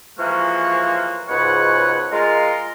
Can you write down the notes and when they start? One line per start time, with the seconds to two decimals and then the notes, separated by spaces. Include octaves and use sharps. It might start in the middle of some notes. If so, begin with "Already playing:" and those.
0.19 E3 F3 G#3 A#3 F#4 C#5
1.29 C#2 G#2 F#4 B4 C#5 F#5
2.12 G#3 F4 A#4